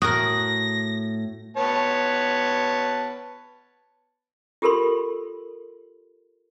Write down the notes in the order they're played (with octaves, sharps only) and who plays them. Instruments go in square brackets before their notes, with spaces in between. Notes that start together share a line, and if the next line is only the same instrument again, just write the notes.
[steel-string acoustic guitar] A2 [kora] F#4 A#4 [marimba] D#6 [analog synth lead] A#6
[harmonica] B3 C#5 A5
[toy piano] F4 G4 A4 A#4 B5 C6